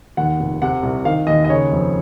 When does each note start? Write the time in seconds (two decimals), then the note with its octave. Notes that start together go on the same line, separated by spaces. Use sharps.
0.17 D#2 F#5
0.40 F1
0.62 C3 F#5
0.83 C2
1.05 D#3 F5
1.27 D#2 D#5
1.45 D#5
1.49 C#3 C#5
1.72 F2